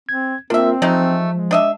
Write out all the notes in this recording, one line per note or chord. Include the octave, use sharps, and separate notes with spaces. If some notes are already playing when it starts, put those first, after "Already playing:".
C4 G#6
A#3 C4 D4 F4 A#4 E5
F3 G#3 A3 D#4
G#3
D4 D#5 E5